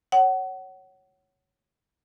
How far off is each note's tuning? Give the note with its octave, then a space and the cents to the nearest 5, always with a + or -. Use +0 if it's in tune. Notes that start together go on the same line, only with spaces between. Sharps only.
C#5 +0 F#5 +25